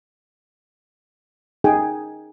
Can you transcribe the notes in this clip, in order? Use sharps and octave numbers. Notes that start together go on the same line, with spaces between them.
D#4 G#4 G5 G#5